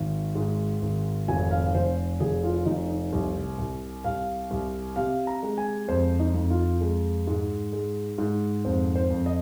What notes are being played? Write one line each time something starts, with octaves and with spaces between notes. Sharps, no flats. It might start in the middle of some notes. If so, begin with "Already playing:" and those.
Already playing: G#1
G#2
G#1
F1 G#5
F5
F1 C5
F1 G#4
F4
F1 D#4
D#4
C2
C2
C2 F5
C2
C3 F5
A#5
G#3
G#5
F2 C5
D#4
F2
F4
G#3
G#2
G#3
G#2
F2 C5
C5
F2
D#5